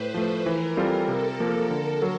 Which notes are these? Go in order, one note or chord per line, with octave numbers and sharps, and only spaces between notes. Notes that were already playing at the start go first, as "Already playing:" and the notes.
Already playing: A2 B4 C5
F3 A3
E3 A#4
G3 C4 F4 A4
C3 A4
F3 A#3
D3
F#3